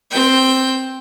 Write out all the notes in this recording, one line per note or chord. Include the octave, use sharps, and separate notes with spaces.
C4 G5